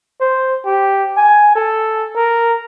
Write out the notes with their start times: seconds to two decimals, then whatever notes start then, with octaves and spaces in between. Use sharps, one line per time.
0.21 C5
0.65 G4
1.16 G#5
1.55 A4
2.16 A#4